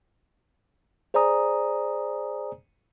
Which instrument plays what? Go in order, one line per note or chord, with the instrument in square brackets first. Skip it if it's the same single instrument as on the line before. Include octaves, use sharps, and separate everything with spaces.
[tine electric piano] G#4 C5 D5 G#5 A#5 D#6